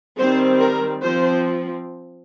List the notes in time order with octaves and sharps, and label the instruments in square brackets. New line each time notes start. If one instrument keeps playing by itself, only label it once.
[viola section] D#3 G3 C4 C5
A#4
F3 C4 C5